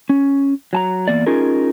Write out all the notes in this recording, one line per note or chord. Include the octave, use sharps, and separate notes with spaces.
C#4
F#3 A5 A#5
E2 A#3 D5
C#4 D#4 F4 G#4 A#4